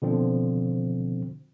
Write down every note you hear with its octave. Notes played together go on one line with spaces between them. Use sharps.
B2 D3 F3 C4